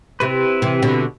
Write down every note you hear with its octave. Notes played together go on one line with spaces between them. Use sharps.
C3 C4 E4 B4
C3 E3
B2 D3